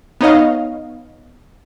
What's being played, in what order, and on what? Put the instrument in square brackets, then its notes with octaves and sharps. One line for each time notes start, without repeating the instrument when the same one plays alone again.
[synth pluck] B3 D#4 C#5 D#5 F5